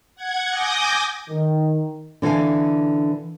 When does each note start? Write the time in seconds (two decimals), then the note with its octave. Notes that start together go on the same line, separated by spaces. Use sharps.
0.16 F#5 G#6
0.49 G#5 D6 D#6 G6 A#6
1.30 D#3
2.22 D3 E3 A4 F5 G#5